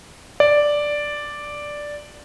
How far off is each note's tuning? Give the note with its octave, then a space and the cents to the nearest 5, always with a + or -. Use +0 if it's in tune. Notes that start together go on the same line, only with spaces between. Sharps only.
D5 +0